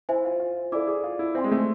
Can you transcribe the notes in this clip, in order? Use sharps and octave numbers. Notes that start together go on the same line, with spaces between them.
E4 C5 E5 G#5
F4
F4
E4 A4 D5 G#5 D6
G#4
F4
E4
C4 C5 E5 G#5 C6
G#3
A3